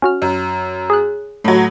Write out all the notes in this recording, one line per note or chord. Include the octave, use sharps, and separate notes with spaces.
C#4 F#4 F6
F#2
G#4 F#6
A2 F#3